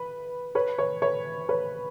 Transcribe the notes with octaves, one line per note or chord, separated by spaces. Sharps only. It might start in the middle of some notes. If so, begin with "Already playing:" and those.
Already playing: B4
B4 C#5
B4 C#5
B4 C#5
B4 C#5